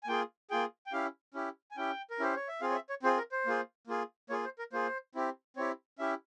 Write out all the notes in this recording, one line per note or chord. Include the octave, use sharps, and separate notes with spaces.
G#5
A#3 F4 G#4 G5
A#3 F4 G#4 G5
G5
C#4 E4 G4 F5
C#4 E4 G4
G#5
C#4 E4 G4 G5
A#4
C#4 E4 G4 C5
C#5
E5
C4 F4 G#4 F5
C#5
E5
C#5
C4 F4 G#4 C5
A#4
C5
A#3 F4 G#4
A#3 F4 G#4
A#3 F4 G#4 C#5
C5
A#4
A#3 F4 G#4 C5
C4 E4 G4
C4 E4 G4 C#5
C#4 E4 G4 E5